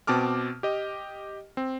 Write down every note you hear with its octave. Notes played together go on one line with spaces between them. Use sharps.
B2 C4 A5 D6 F6
G4 D#5
C4